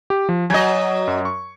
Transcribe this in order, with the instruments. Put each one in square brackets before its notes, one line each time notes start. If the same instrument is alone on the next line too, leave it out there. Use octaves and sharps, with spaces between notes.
[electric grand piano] G4
F3
[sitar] F#3 D#5 [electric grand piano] G#5 G#6
[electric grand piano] F#2
C#6